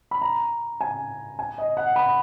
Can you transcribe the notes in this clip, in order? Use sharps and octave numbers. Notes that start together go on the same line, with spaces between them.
B5
A#5
G#5
G#5
D#5
F#5
B5